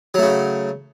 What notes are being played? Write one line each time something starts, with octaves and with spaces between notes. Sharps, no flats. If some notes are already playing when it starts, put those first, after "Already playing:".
C#3 F#3 A3